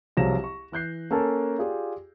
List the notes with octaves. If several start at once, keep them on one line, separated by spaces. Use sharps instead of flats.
C2 F3 F#3 G#4 A#6 E7
C#6
E3 F#6 G6 C7
A#3 C#4 A4 A#4 G#5 A5
F4 G4 G#4 D5